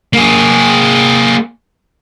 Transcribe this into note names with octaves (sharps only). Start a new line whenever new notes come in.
A#3 G#4